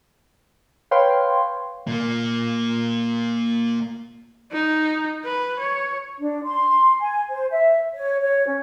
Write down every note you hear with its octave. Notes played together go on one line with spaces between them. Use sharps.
B4 C#5 F5 G5 C6
A#2 A#3
D#4
B4
C#5
D4
C6
G#5
C5
E5
C#5
C#5
C#4